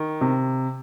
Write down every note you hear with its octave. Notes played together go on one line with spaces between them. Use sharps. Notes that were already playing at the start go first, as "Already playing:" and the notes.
Already playing: D#3
C3